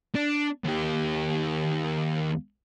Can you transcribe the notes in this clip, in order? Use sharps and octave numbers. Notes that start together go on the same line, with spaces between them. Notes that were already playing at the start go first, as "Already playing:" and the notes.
D4
D#2 G4